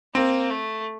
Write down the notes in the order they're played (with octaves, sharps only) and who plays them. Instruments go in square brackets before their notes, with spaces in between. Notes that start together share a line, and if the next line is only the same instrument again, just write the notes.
[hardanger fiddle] A#3 [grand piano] C4
[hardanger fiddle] A3